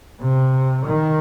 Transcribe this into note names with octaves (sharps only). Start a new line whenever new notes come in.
C3
D#3